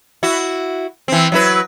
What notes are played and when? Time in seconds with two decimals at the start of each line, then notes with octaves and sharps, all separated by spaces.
0.23 E4 F#4
1.08 E3 C4
1.32 F#3 E4 B4